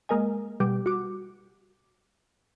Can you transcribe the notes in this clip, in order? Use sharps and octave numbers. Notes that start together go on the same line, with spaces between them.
G#3 A#3 A#4 D#5 G#5
B2 G3 G4
F#4 D6